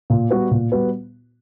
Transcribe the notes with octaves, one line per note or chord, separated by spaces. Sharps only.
A#2
G3 B3 F#4 B4
A#2
G3 B3 F#4 B4